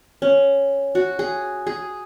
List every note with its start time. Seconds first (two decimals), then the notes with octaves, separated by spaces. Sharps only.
0.22 C#4
0.95 F#4
1.19 G#4
1.67 G#4